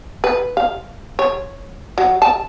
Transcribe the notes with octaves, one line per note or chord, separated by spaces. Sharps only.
B4
F5
C#5
F#3
A5